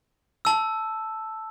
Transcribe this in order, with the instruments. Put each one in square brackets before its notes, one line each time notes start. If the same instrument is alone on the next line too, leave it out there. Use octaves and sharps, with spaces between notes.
[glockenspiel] A5 E6